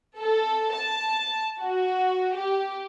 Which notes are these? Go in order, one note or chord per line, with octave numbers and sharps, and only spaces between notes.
A4
A5
F#4
G4